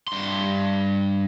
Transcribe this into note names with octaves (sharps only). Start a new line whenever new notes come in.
G2 C6